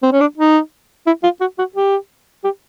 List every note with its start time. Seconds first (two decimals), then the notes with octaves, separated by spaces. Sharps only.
0.03 C4
0.12 C#4
0.20 D4
0.38 D#4
1.07 E4
1.24 F4
1.40 F#4
1.58 F#4
1.75 G4
2.44 G4